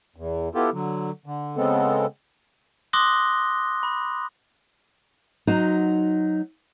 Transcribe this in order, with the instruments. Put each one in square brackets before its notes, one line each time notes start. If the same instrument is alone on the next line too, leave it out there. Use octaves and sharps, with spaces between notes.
[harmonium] E2
B3 E4 F4 G4 A4
D3 F#3
D3
C#3 G#3 B3 C4 A4
[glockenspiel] C6 D6 D#6 F#6 A#6 G7
B5
[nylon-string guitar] F#3 D#4 F#4 C5 F#5